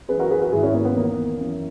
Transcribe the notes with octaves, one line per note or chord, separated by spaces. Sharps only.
F#2 E3 G#4 B4
F#4 A#4
G#4 B4
F#4 A#4
G#2 D#3 E4 G#4
C#4 E4
A#3
B3
E2 D#3 A#3
F#2 E3